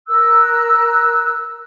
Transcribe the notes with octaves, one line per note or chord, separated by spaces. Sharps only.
A#4 E6 F#6